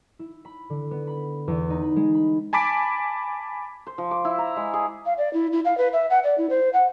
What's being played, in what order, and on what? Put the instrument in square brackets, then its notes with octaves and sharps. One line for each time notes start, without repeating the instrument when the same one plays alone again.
[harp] E4
B5
D3
B3
B5
E2
D#4
B5
G#3
B5
[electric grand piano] G#5 A5 B5 D6 B6 D7
[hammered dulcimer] C5
F3
D6
E4
A#5
G#3
G#4
[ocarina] F5
D5
E4
E4
F5
B4
E5
F#5
D5
E4
C5
F#5